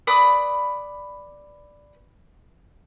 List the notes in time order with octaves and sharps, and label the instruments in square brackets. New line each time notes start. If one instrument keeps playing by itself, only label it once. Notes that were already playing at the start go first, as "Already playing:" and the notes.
[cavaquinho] B4 D5 B5 D#6